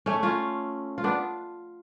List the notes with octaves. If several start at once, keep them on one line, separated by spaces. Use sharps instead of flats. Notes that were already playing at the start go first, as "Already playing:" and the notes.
A3 C#4
C#4 F4
F4
B3 D4